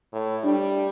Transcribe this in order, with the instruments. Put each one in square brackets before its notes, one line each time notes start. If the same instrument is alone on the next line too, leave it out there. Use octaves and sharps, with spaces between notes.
[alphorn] A2
[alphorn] G3 [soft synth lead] D4